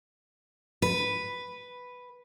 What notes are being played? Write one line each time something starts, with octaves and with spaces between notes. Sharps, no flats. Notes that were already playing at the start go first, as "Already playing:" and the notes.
B4